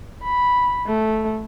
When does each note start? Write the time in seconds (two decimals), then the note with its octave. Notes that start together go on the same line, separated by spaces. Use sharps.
0.23 B5
0.86 A3